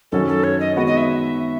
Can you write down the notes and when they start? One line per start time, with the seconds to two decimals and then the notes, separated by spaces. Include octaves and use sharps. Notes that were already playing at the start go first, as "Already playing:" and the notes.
0.12 F#2 D#3 F#3 C#4 F#4 A4
0.28 A4
0.44 C#5
0.60 D#5
0.76 D#3 G#3 B3 F#4 C#5 D#5
0.87 D#5
0.97 E5